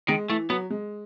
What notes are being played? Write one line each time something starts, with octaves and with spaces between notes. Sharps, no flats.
D#3 G#3
E3 A3
F#3 B3
G#3